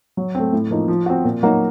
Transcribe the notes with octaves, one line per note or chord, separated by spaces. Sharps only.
F#3
A3 C4
A2
F3 A#3 D#4
F3
C4 F#4
A#2
F#3 A#3 D#4 F#4